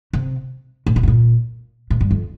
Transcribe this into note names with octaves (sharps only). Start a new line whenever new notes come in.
C3
A2
A#2
A2
A#2
A2
G2
F2